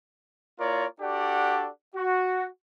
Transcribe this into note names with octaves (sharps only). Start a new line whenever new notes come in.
A#3 E4 F4 A#4 C#5 D5
D4 F#4 G4 A4 D5 F#5
F#4